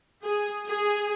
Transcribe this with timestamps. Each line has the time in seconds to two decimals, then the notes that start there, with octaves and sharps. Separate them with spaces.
0.24 G#4
0.68 G#4